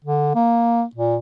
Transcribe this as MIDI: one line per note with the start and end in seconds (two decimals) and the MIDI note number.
0.04 0.31 50
0.35 0.84 58
0.96 1.17 46